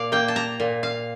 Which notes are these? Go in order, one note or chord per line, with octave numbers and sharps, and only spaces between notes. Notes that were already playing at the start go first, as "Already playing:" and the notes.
Already playing: A#2 D5 F5
A#3 G5
A5
A#5
A#2
F5